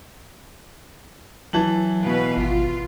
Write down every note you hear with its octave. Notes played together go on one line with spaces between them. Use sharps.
E3 F#3 A5 F#7
B2 B4 F5
G#1 F4